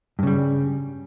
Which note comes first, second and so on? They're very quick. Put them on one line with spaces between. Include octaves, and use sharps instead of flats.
G2 C#3 G3